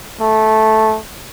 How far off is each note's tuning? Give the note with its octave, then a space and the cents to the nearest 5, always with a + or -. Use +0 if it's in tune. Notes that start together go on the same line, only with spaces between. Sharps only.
A3 -10